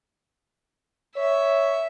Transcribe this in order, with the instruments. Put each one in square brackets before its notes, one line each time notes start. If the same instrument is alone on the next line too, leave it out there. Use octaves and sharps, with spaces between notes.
[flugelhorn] C#5 [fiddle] E5